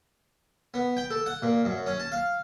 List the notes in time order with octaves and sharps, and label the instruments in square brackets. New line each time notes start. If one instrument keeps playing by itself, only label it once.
[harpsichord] B3
G5
A4
F#5
A#2
F#2
C#4
A5
F5